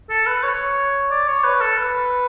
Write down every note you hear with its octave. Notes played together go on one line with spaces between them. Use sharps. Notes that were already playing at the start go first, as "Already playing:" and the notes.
A4
B4
C#5
D5
C#5
B4
A4
B4